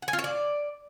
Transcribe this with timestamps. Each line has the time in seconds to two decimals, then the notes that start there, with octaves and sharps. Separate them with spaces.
0.02 F#5
0.08 G#5
0.13 F4
0.19 C#5
0.24 D5